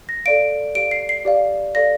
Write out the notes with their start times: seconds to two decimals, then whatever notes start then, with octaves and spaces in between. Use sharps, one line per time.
0.09 A#6
0.26 A4 D5 F5 D7
0.75 G4 D5 F5 D7
0.91 C7
1.09 C7
1.25 G4 D5 F5
1.75 A4 D5 F5 A#6